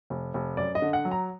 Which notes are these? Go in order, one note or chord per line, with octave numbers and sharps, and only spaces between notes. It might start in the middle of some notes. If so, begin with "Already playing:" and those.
F1
F1
F#2 D5
D#5
D3
F#5
F#3
A#5